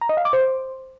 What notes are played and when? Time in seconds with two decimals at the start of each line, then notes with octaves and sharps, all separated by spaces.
0.01 A#5
0.09 D#5
0.17 F5
0.25 D6
0.33 C5